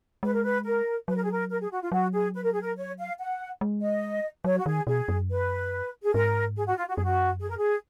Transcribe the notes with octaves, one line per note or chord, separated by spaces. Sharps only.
G#3 B4
A#4
B4
A#4
F#3 B4
A#4
G#4
A#4
A#4
G#4
F#4
F4
F#3 F#4
G#4
B4
A#4
G#4
A#4
C#5
F5
F#5
G#3
D#5
F#3 C#5
F#4
D#3 G#4
B2 G#4
F#2
B4
G#4
G#2 A#4
G#4
F#4
F4
F#4
F#2 G#4
F#4
G#4
A#4
G#4